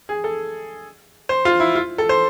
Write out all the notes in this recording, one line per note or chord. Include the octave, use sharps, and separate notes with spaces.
G#4
A4
C5
F4
E4
F4
A4
C5